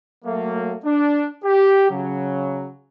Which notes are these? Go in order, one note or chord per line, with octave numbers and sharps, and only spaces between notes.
F#3 A3 A#3
D4
G4
C#3 F#3